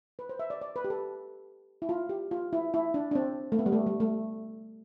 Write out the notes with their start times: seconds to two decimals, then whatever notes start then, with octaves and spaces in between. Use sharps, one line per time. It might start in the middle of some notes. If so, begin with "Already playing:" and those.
0.19 B4
0.29 C5
0.39 E5
0.50 D5
0.61 D5
0.76 B4
0.84 G4
0.90 A4
1.82 E4
1.89 F4
2.09 G4
2.31 F4
2.53 E4
2.74 E4
2.94 D4
3.11 D4
3.15 C4
3.52 A3
3.59 B3
3.66 G3
3.72 A3
3.87 G3
4.00 A3